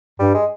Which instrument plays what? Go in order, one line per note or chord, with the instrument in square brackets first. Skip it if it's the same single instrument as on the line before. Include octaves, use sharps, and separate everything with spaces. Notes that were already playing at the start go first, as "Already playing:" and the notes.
[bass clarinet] G2 [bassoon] G3
[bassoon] G#3